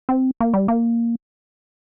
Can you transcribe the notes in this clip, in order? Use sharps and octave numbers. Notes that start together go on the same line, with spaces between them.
C4
A#3
G3
A#3